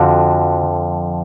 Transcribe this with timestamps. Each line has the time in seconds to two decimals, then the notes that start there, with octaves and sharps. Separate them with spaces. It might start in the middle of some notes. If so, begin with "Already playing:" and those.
Already playing: F2 D3 F3 F#4